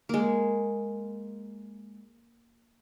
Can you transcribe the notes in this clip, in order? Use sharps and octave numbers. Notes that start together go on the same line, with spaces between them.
G#3 A#3